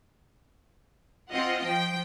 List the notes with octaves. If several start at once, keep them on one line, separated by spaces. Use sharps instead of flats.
C4 F4 D#5 F#5
F3 G5